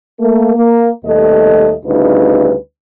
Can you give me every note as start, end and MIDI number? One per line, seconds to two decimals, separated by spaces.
0.19 0.53 57
0.19 0.53 58
0.55 0.87 58
1.05 1.73 39
1.05 1.73 47
1.05 1.73 55
1.05 1.73 57
1.05 1.73 75
1.85 2.55 38
1.85 2.55 49
1.85 2.55 55
1.85 2.55 63
1.85 2.55 64
1.85 2.55 71